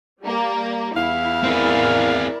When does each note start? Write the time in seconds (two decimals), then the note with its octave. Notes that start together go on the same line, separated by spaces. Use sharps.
0.22 G3 A#3
0.95 E2 E4 F5
1.44 C4 G#4 A#4 D5